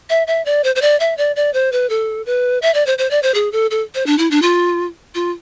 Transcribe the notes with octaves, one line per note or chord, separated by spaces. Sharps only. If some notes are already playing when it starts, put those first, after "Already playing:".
E5
E5
D5
C5
C5
D5
E5
D5
D5
C5
B4
A4
B4
E5
D5
C5
C5
D5
C5
G#4
A4
A4
C5
D4
E4
D4
F4
F4